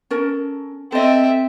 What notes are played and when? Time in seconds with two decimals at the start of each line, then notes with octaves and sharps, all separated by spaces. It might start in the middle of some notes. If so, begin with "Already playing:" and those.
0.11 C#4 A4 A#4
0.92 C4 A4 D#5 E5